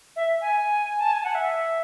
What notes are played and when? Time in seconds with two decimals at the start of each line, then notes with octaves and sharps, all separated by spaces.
0.16 E5
0.41 G#5
1.00 A5
1.13 G#5
1.24 F#5
1.35 E5